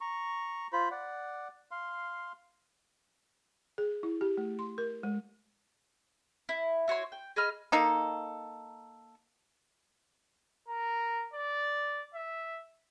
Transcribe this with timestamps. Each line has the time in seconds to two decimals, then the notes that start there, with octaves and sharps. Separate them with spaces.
0.01 A#5 C#6
0.73 F4 C5 B5
0.91 D5 F#5
1.71 F5 C6
3.78 G#4
4.03 E4
4.21 G4
4.37 A3
4.59 C6
4.78 A#4
5.03 G#3
6.49 E4
6.88 E4 F#4 C#5 C6
7.12 G5
7.36 G#4 D#5 B5 F6
7.72 A#3 D#4 A4
10.68 A#4
11.34 D5
12.14 E5